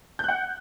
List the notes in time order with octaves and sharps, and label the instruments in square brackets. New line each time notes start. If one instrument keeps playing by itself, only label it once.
[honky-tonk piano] G6
F#6
F#5